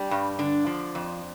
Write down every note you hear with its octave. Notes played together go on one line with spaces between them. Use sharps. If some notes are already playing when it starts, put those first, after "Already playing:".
Already playing: G3 D4
G2
D3 D4
F3
F2